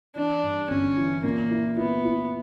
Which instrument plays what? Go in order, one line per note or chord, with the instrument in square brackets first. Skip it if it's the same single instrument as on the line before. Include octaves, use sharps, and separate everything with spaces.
[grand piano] E3 [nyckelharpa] D4
[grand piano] G2
[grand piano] G1 [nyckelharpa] C#4
[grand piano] E3
[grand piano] A#2 [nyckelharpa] A#3
[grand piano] E4
[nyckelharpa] B3 [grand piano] E4
[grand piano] E4